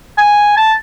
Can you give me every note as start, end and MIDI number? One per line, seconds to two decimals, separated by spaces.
0.18 0.54 80
0.57 0.73 81